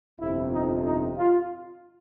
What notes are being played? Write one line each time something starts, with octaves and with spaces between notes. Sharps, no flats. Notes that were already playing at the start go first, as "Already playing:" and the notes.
G1 F2 C3 E4
D#4
D#4
F4